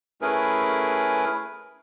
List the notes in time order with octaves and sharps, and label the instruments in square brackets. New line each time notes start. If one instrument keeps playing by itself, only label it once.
[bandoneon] A3 C#4 E4 G#4 A#4 B4